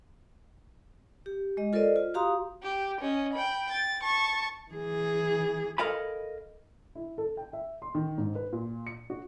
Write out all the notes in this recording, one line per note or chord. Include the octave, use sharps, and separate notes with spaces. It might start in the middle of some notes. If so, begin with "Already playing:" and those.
G4
G#3 D#5
F4 A4 A#4 C5 D5 D#5
F4
F#4 G4 F5 A#5 C6 D#6
G4
C#4 D#5
G5 B5
A6
A5 C#6
E3 G#4
A4 A#4 D#5 F5 G#5 B5
E4
A4
G5
E5
C6
D#3
G#2
B4
A#2
C#7
F#4